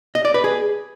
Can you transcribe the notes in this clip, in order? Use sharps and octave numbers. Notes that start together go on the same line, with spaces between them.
D#5
D5
B4
G#4